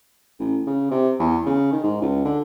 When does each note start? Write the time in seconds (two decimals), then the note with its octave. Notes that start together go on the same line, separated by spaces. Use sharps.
0.39 A1
0.67 C#3
0.91 C3
1.19 E2
1.46 C#3
1.72 D#3
1.84 G#2
2.02 C#2
2.25 D3